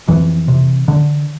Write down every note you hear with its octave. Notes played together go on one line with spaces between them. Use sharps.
F2 E3
C3
D3